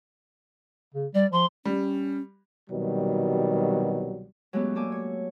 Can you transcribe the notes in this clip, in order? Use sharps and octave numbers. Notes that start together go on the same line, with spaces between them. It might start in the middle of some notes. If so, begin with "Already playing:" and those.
C#3
G3 D5
F3 C6
G3 C#4
C2 B2 D#3 F#3 G3
F#3 G#3 A3 B3 C#4 G4
A3 A#3 A4 D5 G#5
C#5